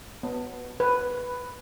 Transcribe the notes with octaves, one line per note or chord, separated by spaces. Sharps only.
B3
B4